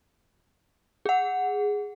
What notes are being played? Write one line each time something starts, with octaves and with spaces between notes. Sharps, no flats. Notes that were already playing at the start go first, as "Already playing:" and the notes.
G#4 F#5